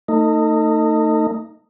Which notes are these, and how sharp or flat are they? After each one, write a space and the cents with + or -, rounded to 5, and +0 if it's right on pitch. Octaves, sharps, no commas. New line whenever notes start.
A3 +35 D#4 +0